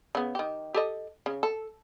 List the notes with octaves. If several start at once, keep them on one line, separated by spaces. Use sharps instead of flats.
C#3 B3
D#3 G4
G4 A4 D#5
C#3
A4